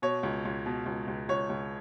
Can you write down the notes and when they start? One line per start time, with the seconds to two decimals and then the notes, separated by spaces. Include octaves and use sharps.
0.02 B2 C#5
0.23 C#2
0.45 C#2
0.66 B2
0.86 C#2
1.08 C#2
1.29 C#2 C#5
1.50 C#2